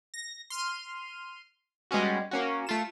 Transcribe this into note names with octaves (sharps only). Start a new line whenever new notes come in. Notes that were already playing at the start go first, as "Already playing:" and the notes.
A#6
C6 F6 D#7
G3 G#3 B3 C#4 F#4
A#3 C#4 F#4
A3 F4 E7